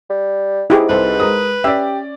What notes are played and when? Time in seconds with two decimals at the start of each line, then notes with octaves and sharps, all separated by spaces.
0.10 G3
0.70 G#2 E4 G4 G#4
0.89 C2 A4 B4 C5
1.20 G#3 A#4 D#6
1.64 C#4 G4 D5 E5